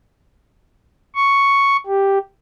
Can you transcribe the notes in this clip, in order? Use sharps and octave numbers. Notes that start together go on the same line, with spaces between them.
C#6
G4